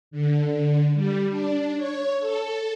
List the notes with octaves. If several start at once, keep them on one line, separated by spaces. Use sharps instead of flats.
D3
G3
D4
C#5
A4